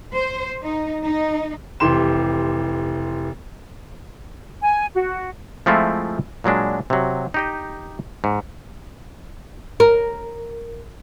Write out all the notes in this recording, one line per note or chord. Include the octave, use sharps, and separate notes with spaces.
C5
D#4
D#4
F1 E3 G4 C6 E7
G#5
F#4
F3 G#3 A3 C4 E4 F4
A#2 F#3 G#3 D4
C3 F#3
D#4 G4 D#5
G#2
A#4